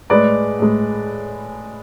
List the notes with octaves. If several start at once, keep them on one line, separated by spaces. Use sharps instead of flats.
A2 G#3 B4 D5
A2 G#3